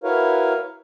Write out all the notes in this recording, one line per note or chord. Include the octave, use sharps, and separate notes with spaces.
E4 F#4 A#4 B4 C#5 F5